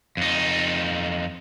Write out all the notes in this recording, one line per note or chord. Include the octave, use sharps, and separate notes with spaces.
F2 D#4